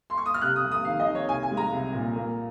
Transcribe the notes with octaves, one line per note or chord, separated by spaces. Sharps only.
C6
C#6
D#6
F6
C3 F#6
D#6
C2
D#6
D#3 F5
D#5
D#3
C#5
C2 G#5
G#5
G#3
A#5
C2
A#2
A#3